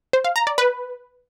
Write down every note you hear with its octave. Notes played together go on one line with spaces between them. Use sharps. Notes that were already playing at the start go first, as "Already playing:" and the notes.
C5
F5
A#5
D5
B4